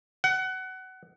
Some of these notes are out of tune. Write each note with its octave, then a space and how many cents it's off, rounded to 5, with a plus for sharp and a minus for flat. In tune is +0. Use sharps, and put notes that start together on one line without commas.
F#5 +20